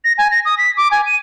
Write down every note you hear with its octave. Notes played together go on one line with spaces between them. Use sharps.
A#6
G#5
A#6
D#6
B6
D6
G#5
D#7